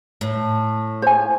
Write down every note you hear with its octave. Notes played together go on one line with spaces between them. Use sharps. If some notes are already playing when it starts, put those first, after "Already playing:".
A2
C5 G#5